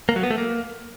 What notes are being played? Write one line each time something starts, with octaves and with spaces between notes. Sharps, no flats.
A#3
F#3
B3
A3
A#3